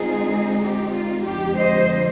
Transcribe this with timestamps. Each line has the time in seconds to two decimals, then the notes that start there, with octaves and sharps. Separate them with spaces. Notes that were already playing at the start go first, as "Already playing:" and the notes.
Already playing: D3 G#3 C4 D#4 F4 G#4
0.61 G4
0.93 F4
1.25 F2 D3 G#3 G4
1.57 C5 D#5